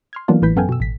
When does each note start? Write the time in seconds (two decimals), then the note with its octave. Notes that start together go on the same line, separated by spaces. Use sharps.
0.13 C6 F6 G#6
0.28 E3 F#3 A#3 B3 D4 F4
0.42 A1 A2 E3 B4 G6 B6
0.56 F#2 B3 A4 F5 G5 G#5
0.69 B2 E6
0.80 A1 B6